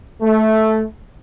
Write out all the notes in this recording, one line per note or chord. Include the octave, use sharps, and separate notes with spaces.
A3